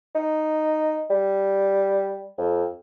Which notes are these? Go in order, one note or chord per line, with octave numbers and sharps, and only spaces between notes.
D#4
G3
F2